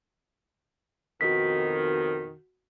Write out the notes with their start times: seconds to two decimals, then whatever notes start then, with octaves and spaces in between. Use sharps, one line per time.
1.21 F2 B2 D#3 F#4 B6